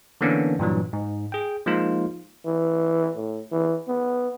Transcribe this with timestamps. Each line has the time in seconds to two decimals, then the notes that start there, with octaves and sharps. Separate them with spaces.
0.21 D3 E3 A#3 B3 C#4 D4
0.59 G2 A#2 E3 F#3
0.93 G#2
1.32 G#4 G5
1.66 F3 G#3 A#3 D#4 F4
2.46 E3
3.16 A2
3.52 E3
3.88 B3